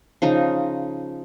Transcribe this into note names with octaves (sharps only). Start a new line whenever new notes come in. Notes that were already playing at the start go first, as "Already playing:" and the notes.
C#3 F3 D#4 A#5